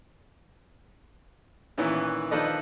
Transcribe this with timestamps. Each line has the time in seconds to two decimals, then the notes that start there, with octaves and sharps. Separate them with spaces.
1.78 A#2 D#3 E3 B3 C#4 E4
2.31 D#3 F3 D4 A4 B4 D#5